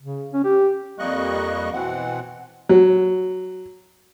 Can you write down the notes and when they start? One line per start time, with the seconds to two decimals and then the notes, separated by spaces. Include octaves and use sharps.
0.02 C#3
0.33 C#4
0.45 G4
0.99 F2 G3 A#3 D#5 C#6 F#6
1.73 B2 E3 C4 F#5
2.69 F#3